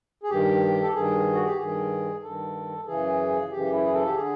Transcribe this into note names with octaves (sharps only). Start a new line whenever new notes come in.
G#4
G2 D#3 G4
A4
G2 D#3 G#4
F#4
G4
G2 D#3 G#4
G2 D#3 A4
F#2 C#3 E3 G#4
F#2 C#3 E3 G4
E4
G#4
A4
G4
D3 G#4